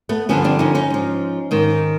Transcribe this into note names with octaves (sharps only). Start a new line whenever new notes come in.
A3 B3
G2 D3 F3 B3 C#4
C4 D4
C#4 D#4
C#4 D#4
G#2 F3
G#2 D#3